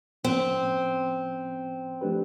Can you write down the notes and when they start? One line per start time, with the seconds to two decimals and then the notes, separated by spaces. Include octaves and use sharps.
0.24 A2 F3 A#3 C4 C#4
2.01 F3 A3 D4 G4 B4